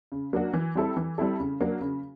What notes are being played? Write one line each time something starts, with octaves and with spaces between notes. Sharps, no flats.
C#3
F#3 A#3 D4 F#4
E3
G3 C4 E4 A4
E3
G3 C4 E4 A4
C#3
F#3 A#3 D4 F#4
C#3